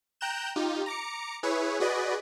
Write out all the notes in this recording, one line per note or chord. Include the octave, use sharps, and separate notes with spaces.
G5 A#5 F#6 G6 E7
D#4 F4 G4
A#5 D6 C#7
E4 G#4 B4 C#5
F#4 G#4 B4 D5 D#5